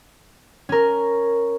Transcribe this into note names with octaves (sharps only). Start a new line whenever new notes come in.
C#4 A#4